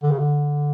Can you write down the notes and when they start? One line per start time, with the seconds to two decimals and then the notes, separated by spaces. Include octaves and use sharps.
0.03 D3
0.11 C#3
0.19 D3